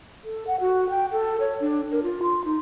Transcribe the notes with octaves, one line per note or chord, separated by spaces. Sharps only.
A4
F#5
F#4
G5
A4
C#5
D4
A#4
F4
C6
D#4